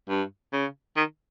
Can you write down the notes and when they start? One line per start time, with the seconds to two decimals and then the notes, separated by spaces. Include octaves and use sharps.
0.09 G2
0.53 C#3
0.97 D#3